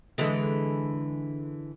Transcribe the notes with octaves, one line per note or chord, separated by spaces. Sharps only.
D3 E3 G#3